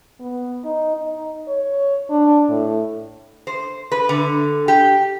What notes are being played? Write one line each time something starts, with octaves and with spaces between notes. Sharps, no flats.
B3
D#4
D#4
C#5
D4
A2
C5
B4
D3
G4